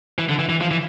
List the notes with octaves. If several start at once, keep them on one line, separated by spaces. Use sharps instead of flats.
E3
D3
E3
E3
F3
E3